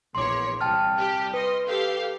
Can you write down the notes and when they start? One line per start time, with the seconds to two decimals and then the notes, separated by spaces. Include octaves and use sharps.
0.15 A#1 E2 C#5 C6 D6
0.61 C2 G5 A5 F6
0.95 G3 G4
1.34 B4 D#5 C6
1.67 G4 A4 F5